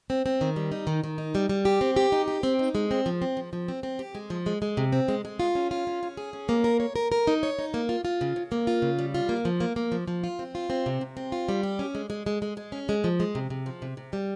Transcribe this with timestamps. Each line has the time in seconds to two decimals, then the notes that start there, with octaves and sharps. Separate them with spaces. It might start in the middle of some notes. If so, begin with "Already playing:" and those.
0.10 C4
0.26 C4
0.41 D#3
0.56 G3
0.72 D#4
0.87 D#3
1.04 D#3
1.18 D#4
1.35 G3
1.49 G3
1.65 G4
1.81 C4
1.96 G4
2.12 D#4
2.28 G4
2.43 C4
2.59 D#4
2.75 G#3
2.91 C4
3.06 F3
3.22 C4
3.37 F3
3.53 F3
3.68 C4
3.83 C4
3.99 G4
4.15 G#3
4.30 F3
4.46 G#3
4.62 G#3
4.77 C3
4.92 C4
5.08 G#3
5.25 G#3
5.40 F4
5.55 C#4
5.71 F4
5.87 C#4
6.03 C#4
6.17 G#4
6.33 C#4
6.49 A#3
6.64 A#4
6.80 C#5
6.96 A#4
7.12 A#4
7.27 D#4
7.43 C#5
7.59 D#4
7.74 A#3
7.89 F4
8.05 F4
8.21 C#3
8.36 C#3
8.52 A#3
8.67 F4
8.82 C#3
8.99 G3
9.14 F4
9.29 A#3
9.45 F3
9.60 A#3
9.76 A#3
9.92 F3
10.08 F3
10.24 F4
10.39 C4
10.55 F4
10.70 C4
10.86 C3
11.01 C3
11.17 C4
11.32 F4
11.49 G3
11.63 G4
11.79 C#4
11.95 G#3
12.10 G#3
12.26 G#3
12.42 G#3
12.57 G#3
12.72 C#4
12.89 G#3
13.04 F3
13.20 G#3
13.35 C3
13.50 C3
13.66 F3
13.82 C3
13.97 C3
14.13 G3